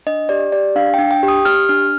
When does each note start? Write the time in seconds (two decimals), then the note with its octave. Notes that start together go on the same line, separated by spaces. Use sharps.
0.07 D4 D#5
0.29 G4 D5
0.53 G4 D5
0.76 D4 F5
0.94 G5
0.99 D4
1.11 G5
1.23 G4
1.28 D#6
1.45 G4 F6
1.69 D4 F6